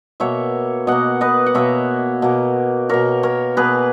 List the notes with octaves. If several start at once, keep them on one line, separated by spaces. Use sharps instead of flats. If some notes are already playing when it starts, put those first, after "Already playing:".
B2 A#3 C#5 E5
B2 A#3 D#5 F#5
B4 D#5
F#5
B2 A#3 C#5 E5
B2 A#3
B2 A#3 A#4 C#5
A#4 C#5
B2 A#3 G#4 B4